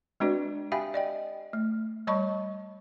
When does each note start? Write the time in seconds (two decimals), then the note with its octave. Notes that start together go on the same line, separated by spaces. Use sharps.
0.20 G#3 C4 D4 F#4 B4 D5
0.72 G4 E5 F5 G5 G#5 B5
0.94 D5 D#5 G5
1.53 A3
2.07 G3 C#5 D#5 A5 B5 C#6